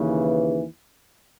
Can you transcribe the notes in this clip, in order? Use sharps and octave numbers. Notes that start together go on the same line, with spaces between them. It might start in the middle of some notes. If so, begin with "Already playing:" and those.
Already playing: D#2 C#3 E3